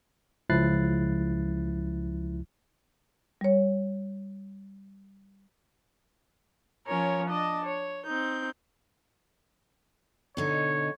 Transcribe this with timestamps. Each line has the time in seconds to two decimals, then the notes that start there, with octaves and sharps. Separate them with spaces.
0.50 C#2 F3 E4 F#6 A6 C7
3.41 G3 C#5
6.86 F3 C#4 A#4 C#5
7.29 D4 D#5 A5
7.64 C#5
8.05 C4 D#4 G6
10.37 B2 D3 D#4 C#5